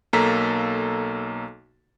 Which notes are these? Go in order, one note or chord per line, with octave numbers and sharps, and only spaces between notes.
B1 A#3 A4 A#5 B6